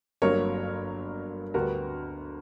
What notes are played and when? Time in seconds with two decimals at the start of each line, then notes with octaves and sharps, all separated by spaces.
0.22 G1 G2 F#3 A#3 A#4 C#5
1.54 D2 D3 G3 B3 F#4 A#4